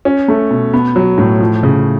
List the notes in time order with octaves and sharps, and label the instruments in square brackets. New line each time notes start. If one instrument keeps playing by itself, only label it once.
[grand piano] C#4
A3
B2
B3
F#3
A2
F3
C#3